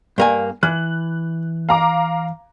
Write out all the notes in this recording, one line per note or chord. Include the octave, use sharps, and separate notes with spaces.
G2 A#3 G#5
E3 F#6
F5 A#5 D6